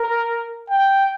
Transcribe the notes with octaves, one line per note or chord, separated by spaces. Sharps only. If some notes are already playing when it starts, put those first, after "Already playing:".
Already playing: A#4
G5